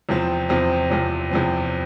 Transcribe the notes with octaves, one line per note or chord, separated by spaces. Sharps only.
E2 C3 F3 C4
E2 C3 F3 C4
E2 C3 F3 C4
E2 C3 F3 C4